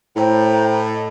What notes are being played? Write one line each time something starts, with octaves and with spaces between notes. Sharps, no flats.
A2 C5 G5 A#5
D#5